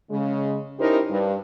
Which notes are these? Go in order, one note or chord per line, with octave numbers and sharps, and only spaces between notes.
C#3 G#3
C#4 D#4 E4 G4 A#4 C5
G2